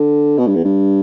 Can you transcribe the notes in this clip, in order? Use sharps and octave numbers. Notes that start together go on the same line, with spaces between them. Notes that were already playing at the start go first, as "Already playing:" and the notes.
Already playing: D3
B2
G2
E2
G2